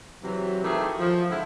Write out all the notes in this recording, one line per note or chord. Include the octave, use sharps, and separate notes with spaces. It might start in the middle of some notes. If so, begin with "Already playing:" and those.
C3 E3 F#3
D#3 E3 A3 G4 G#4
F3
D3 G#3 E4